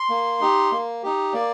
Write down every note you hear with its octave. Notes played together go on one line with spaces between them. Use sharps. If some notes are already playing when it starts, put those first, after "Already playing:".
Already playing: C6
A#3
D#4 G4
A#3
D#4 G4
A#3 D5